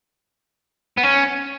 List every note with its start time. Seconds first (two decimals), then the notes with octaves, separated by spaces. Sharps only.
0.98 B3
1.04 C#4